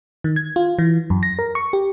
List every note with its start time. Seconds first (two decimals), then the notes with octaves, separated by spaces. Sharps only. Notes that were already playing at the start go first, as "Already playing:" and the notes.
0.24 D#3
0.36 G#6
0.56 F4
0.78 E3
1.10 F#2
1.23 A#6
1.39 A#4
1.55 C#6
1.73 G4